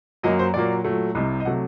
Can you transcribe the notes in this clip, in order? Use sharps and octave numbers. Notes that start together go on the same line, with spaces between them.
F#2 F#3 A#3 D#5
C5
A#2 F#3 A#3 D5
A#2 F#3 A3
C2 C3 G3 D#5
D#5
C3 F#3 A3 F#5